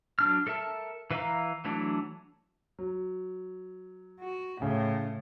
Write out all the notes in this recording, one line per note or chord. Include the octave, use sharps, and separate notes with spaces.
F#3 D4 F6
A4 A#4 E5 A5
E3 B4 E5 F5 A#5
E3 F#3 A3 D4
F#3
F#4
A2 C#3